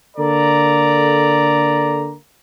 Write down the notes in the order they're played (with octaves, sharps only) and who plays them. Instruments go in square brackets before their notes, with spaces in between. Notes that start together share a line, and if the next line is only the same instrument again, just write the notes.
[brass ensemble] D3 A#3 A4 D5 A#5